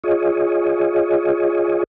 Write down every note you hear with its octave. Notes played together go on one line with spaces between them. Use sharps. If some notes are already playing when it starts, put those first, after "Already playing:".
F4 G#4 C#5 D#5